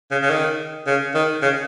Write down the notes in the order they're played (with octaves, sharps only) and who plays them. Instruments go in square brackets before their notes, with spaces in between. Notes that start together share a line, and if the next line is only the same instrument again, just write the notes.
[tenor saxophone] C#3
C#3
D#3
C#3
D#3
C#3